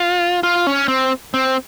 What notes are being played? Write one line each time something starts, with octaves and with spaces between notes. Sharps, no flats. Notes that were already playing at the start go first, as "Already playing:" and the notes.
Already playing: F4
F4
C#4
C4
C4